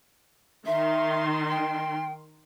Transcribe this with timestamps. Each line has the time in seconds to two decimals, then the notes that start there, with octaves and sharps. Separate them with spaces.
0.66 D#3 E5 C6
1.50 G5